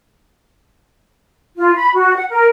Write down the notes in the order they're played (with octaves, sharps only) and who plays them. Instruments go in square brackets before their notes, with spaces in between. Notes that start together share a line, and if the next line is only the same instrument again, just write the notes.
[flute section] F4
B5
F#4
F#5
A#4